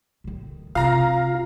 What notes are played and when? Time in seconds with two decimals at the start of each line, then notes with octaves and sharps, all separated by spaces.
0.24 A2 D#3
0.75 C3 F4 F5 A#5